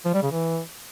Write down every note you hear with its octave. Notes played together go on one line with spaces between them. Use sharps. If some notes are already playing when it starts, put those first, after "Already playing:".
F3
G3
C#3
E3